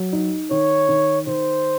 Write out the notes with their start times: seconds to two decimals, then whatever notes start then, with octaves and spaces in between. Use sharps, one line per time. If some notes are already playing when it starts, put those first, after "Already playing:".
Already playing: F#3
0.13 D#4
0.51 D#3 C#5
0.89 D#3
1.27 D#3 C5